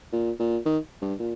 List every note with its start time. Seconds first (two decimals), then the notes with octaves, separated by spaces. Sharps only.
0.12 A#2
0.39 A#2
0.66 D#3
1.02 G2
1.19 A#2